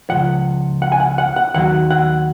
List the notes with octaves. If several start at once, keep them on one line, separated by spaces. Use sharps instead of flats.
C#2 C#3 F3 F#5
F#5
G#5
F#5
F#5
F#5
D#2 D#3 F#3 F#5
F#5